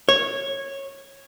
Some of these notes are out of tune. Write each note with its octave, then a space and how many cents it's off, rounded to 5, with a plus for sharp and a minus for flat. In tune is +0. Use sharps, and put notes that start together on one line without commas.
C#5 -15